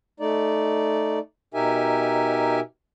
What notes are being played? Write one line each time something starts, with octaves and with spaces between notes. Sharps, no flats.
A3 D#4 D5
B2 D#4 G4 A#4 E5 G#5